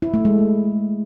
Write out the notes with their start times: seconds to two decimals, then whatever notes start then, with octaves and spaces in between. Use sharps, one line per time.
0.02 E4
0.14 A3
0.25 G#3